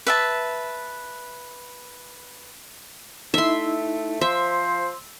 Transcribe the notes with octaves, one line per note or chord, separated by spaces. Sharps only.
B4 E5 A5
A3 D#4 E4 E5 C6
F3 C5 E5 C6 E6